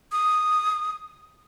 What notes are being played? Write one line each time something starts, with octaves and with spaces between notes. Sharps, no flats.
D#6